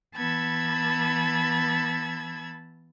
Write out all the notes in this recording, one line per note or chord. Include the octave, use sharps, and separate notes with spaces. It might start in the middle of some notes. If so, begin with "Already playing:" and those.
E3 B3 A5 B5 E6 G#6